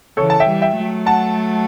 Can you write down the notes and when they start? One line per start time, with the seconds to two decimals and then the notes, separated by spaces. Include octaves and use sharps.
0.17 C#3 E3 A4 C#5
0.30 A5
0.40 E5 G5
0.46 E3 G3
0.61 E5 G5
0.76 F#3 A3
1.06 F#5 A5